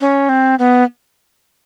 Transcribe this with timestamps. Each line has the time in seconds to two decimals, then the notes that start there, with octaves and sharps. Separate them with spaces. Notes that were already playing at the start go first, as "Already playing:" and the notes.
0.01 C#4
0.29 C4
0.59 B3